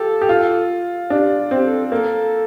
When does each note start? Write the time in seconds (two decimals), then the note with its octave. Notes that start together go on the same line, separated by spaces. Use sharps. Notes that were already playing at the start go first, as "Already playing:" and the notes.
Already playing: F4 G4 A4
0.21 G4
0.29 F4
1.10 D4 G4
1.51 C4 G4
1.64 A4
1.91 A#3 A4